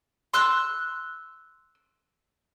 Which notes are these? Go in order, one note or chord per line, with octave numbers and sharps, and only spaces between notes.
C6 E6 F#6